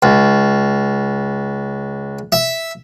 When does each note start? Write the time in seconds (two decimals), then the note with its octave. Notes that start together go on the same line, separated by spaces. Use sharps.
0.03 C#2
2.32 E5